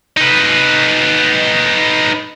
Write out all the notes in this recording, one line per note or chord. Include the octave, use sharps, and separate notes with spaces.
D#4 B4